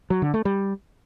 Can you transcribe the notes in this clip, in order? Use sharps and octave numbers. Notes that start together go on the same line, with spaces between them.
F#3
D3
A3
G3